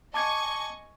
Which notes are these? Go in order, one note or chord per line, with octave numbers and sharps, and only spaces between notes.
D#5 G#5 A5 C#6 D6 G#6